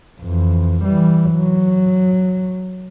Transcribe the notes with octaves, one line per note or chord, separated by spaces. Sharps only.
F2 E3
E3 G3
F#3